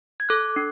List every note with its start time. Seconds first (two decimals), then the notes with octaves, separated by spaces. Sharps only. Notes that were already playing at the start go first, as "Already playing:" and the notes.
0.20 G#6
0.29 A4 D6 F#6
0.56 D4